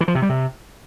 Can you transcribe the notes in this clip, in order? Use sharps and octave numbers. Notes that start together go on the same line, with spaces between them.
E3
F3
C3
G3
C3